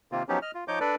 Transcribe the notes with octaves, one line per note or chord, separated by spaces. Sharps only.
C3 D#3 A#3 C4 F4
F3 F#3 B3 C#4 D#4 G4
D#5 F6
F4
F3 D#4 C#5 D#5 D6 G6
D4 A4 B4 D5